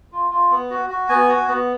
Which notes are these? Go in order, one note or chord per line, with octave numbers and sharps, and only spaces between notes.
F4
F4
B3
F#4
F#4
B3 G#5
F#4
B3